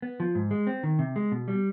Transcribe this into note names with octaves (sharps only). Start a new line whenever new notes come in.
B3
F3
G#2
G#3
C4
D#3
C3
G#3
B2
G3